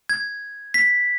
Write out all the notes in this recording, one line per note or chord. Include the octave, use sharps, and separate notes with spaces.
G#6
B6